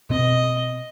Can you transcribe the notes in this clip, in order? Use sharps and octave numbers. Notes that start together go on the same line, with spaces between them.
B2 C4 D#5